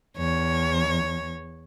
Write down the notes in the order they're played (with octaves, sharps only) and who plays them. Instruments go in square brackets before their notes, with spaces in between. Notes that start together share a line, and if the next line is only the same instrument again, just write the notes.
[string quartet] E2 C#5